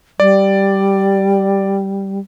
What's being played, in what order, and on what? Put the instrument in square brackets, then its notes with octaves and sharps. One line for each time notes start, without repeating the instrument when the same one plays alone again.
[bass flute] G3 [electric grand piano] D5